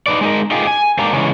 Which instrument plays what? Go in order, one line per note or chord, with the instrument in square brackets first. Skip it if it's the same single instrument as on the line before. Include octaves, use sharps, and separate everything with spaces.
[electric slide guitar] D#4 B4 D5
G#3 D#4 A#4
D#4 F4 G4 G#4
G#5
G#2 A#3 D4 G4 A#5
C#3 E3 G#3 C#4